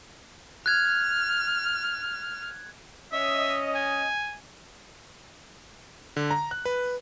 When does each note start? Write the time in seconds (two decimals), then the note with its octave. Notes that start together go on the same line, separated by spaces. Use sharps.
0.66 F6 F#6 G#6
3.12 C#4 D#5 E5
3.75 G#5
6.16 D3
6.31 A#5
6.51 F#6
6.65 B4